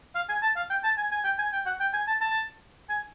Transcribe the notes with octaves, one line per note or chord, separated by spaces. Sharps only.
F5
G#5
A5
F5
G5
A5
G#5
G#5
G5
G#5
G5
F#5
G5
G#5
A5
A5
G#5